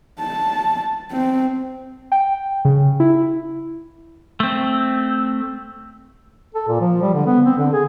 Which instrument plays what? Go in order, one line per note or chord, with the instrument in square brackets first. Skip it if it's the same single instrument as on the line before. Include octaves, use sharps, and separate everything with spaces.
[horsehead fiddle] A5
C4
[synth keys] G5
C#3
E4
[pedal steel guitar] A3 C4
[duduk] A4
A#2
F3
G3
D3
B3
C4
D3
G#4